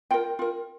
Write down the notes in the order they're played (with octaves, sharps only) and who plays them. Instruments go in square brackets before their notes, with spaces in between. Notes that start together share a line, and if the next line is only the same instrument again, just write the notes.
[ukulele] F4 A#4 G5
F4 A#4